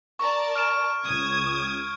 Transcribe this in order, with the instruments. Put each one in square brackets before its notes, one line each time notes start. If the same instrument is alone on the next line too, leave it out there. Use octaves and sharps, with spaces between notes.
[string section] A#4 D5 A5 [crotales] C#6
[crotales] F6 D7 E7
[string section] C#2 D#6 G#6